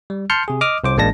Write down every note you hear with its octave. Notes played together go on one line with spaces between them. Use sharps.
G3
A5 C6 F6 G6 C#7
C3 G#4
D#5 D6 D#6 F6
C2 C5 D6
A1 G#3 A#3 D4 A5 A#6